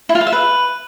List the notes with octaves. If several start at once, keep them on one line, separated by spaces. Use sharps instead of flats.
E4
F4
F5
E5
B4